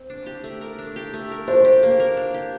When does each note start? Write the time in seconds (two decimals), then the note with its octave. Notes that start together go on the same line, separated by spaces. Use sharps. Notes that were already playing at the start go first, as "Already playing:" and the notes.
Already playing: C4
0.10 D4
0.26 G4
0.44 A3
0.61 A#4
0.79 D4
0.96 G4
1.14 A3
1.31 A#4
1.48 D4 C5
1.65 G4
1.83 A#3
2.00 A#4
2.17 D4
2.34 G4